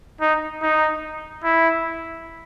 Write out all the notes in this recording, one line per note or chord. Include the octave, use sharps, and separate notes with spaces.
D#4
D#4
E4